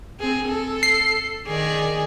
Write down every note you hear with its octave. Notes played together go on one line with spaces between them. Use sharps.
C4 G#4
A4
C7
D#3 G#4 D5